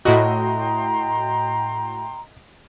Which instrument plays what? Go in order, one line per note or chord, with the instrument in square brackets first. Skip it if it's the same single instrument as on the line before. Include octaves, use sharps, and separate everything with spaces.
[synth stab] A2 E4 F#4 [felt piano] D#5 [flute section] G5 A#5 C6